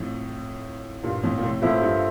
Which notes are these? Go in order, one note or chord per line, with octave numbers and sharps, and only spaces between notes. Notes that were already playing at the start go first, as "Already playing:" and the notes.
Already playing: F2 A2
G2 A#2
F2 A2
A#2
A2 C3
F2 A2 A#3 F4 A4 C5 E5
G2